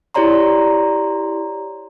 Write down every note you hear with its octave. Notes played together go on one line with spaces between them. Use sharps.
E4 G4 C#5 D5 A#5 C6